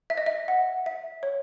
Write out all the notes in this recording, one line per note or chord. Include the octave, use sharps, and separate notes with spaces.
E5
D#5
E5
F#5
E5
C#5